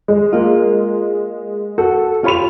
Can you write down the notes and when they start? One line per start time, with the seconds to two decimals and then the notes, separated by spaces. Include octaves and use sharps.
0.08 G#3
0.33 A#3 F4
1.78 F#4 A4
2.24 F4 G4 C#5 B5 F7